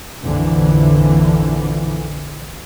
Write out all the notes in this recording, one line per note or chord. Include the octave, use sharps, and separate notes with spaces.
A#1 F2 D3 E3